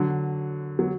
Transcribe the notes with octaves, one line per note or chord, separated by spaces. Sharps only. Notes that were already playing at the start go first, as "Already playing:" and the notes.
Already playing: D3 F#3
F#3